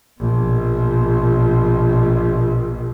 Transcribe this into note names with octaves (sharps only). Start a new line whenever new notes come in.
A#1 B2